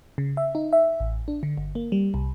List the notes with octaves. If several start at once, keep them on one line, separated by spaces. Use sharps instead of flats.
C#3
E5
D#4
E5
A1
D4
D3
G1
A#3
G3
C2